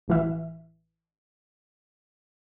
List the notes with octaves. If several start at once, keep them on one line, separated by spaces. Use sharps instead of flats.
A1 E3 E5